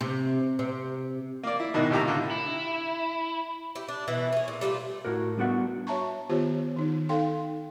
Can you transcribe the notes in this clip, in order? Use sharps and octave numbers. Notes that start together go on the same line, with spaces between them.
C3
C3
A#3 D5
E4
G#2 B2 D#3 E4
C2 A2 G4 A#5
D3 F4
E4
E4 G4
D4
B2 E3 E4
C#4 G#4
A#2
G3 A3 F4 D5
A2 F#4 A#4
G3 B3 D4 F#4 B4 F#5
C#5 E5 A5 A#5 C#6
D#3 B3 F4 G4 C5 C#5
D#3 D#4
D#4 A4 F5 G5 C6